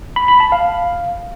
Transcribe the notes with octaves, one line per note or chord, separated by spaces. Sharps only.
B5
B5
A5
F5